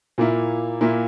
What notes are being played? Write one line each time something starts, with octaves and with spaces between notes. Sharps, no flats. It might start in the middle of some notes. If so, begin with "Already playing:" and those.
A#2 A#3 E4
A#2 A#3 E4